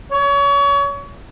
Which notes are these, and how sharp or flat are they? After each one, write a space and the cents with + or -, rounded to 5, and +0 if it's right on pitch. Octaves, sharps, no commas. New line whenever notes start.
C#5 +30